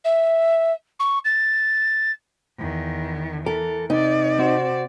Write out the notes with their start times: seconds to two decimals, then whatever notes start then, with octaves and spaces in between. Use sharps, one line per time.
0.05 E5
1.00 C#6
1.25 A6
2.58 E2 D#3
3.46 E3 A4 A#4
3.90 C3 D#4 D5
4.39 C4 F#4 C5